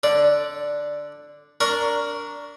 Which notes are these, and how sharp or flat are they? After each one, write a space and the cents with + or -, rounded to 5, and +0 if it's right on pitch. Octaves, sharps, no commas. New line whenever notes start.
D3 +5 D5 +0
D4 -15 A#4 +0 C#6 +10